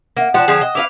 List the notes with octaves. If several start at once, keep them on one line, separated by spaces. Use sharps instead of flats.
A#3 E5 F#5
F3 D4 F#5 G5 F#6 E7
D3 F3 G#4
D#5
E4 B4 F5 D6 F7